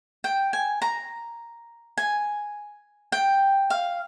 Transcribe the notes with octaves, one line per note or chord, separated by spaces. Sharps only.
G5
G#5
A#5
G#5
G5
F5